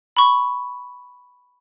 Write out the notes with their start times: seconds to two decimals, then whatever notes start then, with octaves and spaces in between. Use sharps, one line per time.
0.17 B5 C#6